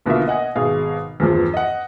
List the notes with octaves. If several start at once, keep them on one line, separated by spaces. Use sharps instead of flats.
B1 B2 D3 A#3 F4 E5
D#5 F#5 G#5
G#1 B2 G#4 F5
E2 G2 F3
D#5 F#5